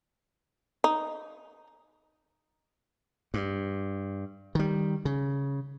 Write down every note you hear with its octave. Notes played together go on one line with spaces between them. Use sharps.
D#4
G2
D#3 G3
C#3